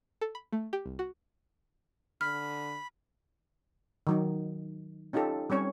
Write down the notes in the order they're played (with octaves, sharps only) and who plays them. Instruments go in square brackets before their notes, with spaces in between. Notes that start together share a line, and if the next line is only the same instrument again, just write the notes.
[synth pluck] A4
B5
A3
G4
C2
F#4
[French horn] D3 [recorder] B5 [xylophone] F6
[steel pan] D#3 F#3 D#4
C#4 D#4 F4 G4 A4
G3 C4 C#4 C#5